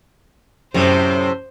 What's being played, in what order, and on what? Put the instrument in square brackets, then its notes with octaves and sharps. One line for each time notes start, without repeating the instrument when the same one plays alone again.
[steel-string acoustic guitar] F#2 [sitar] A2 C3 [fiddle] C5